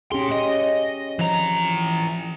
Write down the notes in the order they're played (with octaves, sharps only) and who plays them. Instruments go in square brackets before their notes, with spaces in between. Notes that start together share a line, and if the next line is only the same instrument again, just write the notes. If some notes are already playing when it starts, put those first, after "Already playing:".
[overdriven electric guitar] A#2 C6 [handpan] C#4 G4 G#4
[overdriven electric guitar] D#5
[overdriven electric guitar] E3 A#5 [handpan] F3